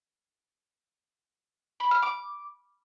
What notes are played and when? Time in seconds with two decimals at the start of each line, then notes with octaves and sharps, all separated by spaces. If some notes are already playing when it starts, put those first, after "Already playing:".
1.80 B5
1.91 F6
2.02 D6